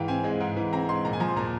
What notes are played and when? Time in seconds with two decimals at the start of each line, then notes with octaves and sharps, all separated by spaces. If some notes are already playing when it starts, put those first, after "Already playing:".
Already playing: G#2 E3 F5 G5
0.08 C4 G#5
0.24 G#3
0.40 G#2
0.56 E3
0.73 C4 A#5
0.89 G#3 C6
1.05 A#2 A#5
1.13 G#5
1.20 F3 A#5
1.28 C6
1.36 A#2 A#5